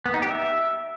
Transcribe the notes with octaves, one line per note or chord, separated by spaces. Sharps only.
B3
D#4
G4
E5